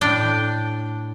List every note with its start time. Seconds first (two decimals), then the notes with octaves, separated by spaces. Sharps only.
0.01 A2 D4 G5